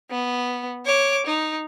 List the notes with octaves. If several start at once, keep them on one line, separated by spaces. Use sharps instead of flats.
B3
C#5 D6
D#4